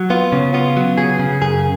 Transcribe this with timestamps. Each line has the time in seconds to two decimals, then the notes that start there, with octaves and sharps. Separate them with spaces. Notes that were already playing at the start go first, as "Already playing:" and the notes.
Already playing: F#3
0.10 B3 F4
0.32 C#3
0.54 B3 F4
0.77 F#3
0.98 C#3 G#4
1.19 C#3
1.41 F#2 G#4